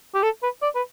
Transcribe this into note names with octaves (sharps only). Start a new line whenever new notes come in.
G4
A4
B4
D5
B4